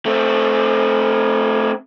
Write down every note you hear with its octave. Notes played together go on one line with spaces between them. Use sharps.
A3 C4